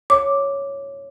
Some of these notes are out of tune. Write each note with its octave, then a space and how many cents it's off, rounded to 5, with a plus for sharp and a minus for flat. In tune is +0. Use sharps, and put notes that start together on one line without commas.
C#5 +0 D6 +0